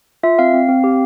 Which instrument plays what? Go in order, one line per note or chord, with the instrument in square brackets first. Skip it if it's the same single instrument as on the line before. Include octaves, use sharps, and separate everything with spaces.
[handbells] F4 E5
C4 F5
C4
C4
G4